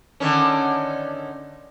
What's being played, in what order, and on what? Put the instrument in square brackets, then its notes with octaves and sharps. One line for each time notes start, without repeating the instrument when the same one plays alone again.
[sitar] D3 D#3 C#4